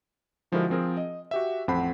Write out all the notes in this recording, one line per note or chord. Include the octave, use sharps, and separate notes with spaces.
D3 F3 G#3 E4 F#4 A#4
F3 C4 G#4 A#4
D#5
F#4 G4 E5
A1 F2 C4 F#5 B5 C7